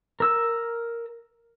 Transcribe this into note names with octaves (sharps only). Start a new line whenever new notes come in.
A#4 E6